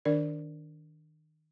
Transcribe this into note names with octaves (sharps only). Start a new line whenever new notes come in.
D#3 D4 A#4 D5